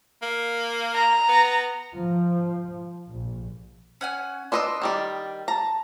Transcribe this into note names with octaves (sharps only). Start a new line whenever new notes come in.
A#3
A#5
B3
F3
A#1
C#4 F#5 G#5
D4 B4 D#5 C6 C#6 E6
D#3 G3 D5
A5 A#5